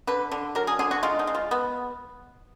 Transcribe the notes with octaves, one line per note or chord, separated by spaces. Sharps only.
D3 B4
D3
F#3 A#4
G#4
D3 G#4
F#4
G#3 F4
D#4
G#3
F4
B3